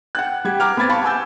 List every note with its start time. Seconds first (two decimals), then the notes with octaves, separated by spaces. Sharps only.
0.15 F#5 G5 F#6
0.44 G3 G4 G#6
0.60 A#5 D6 F6
0.77 B3 C4 B5 G#6 A6
0.89 F5 A5 B5 C#6 D6
1.03 F#5 G#5 E6 G6